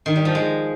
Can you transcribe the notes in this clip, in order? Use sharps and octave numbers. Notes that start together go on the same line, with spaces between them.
D#3
G3
F3
G#3